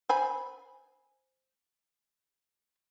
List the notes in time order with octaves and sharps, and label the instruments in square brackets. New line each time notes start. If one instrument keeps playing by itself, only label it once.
[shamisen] C5 G#5 B5